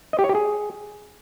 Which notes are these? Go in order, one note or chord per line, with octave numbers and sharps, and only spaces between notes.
D#5
G4
C#5
G4
G#4